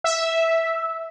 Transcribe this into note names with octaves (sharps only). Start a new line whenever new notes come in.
E5